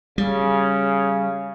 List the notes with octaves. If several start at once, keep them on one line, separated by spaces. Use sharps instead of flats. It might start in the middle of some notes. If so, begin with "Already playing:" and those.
C#3 G3